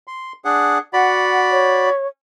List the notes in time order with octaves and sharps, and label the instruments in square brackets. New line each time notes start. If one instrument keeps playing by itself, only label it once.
[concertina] C6
D4 G#4 F#5
[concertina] F#4 D5 B5 [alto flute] F#5
[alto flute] C#5